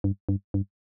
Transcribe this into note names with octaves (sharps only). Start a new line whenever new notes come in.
G2
G2
G2